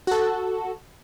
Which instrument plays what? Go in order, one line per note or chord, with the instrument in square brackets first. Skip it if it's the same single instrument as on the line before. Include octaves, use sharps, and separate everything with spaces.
[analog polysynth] F#4 A4